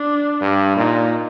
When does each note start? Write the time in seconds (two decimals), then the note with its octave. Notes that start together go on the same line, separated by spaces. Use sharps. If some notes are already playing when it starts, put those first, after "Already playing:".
Already playing: D4
0.41 G2
0.76 A#2 D#4